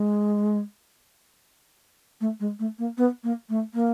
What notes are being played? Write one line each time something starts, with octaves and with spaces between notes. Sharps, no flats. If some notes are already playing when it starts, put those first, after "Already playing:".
Already playing: G#3
A3
G#3
A3
A#3
B3
A#3
A3
A#3